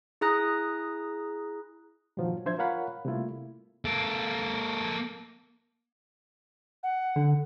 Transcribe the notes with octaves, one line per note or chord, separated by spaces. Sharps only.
E4 G#4 A#5 D#6 F#6 A#6
G2 A#2 D#3 F3 F#3
F3 D4 C5 E5 G#6
F4 A#4 C#5 F5 F#5 B5
C3 G3 A3 A#3 E4 F4
A#3 A4
F#5
D3